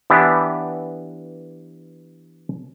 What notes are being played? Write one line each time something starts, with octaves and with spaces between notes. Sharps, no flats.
E3 B3 D4 G4 E5